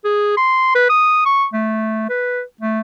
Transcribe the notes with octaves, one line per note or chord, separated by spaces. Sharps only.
G#4
C6
B4
D#6
C#6
A3
B4
A3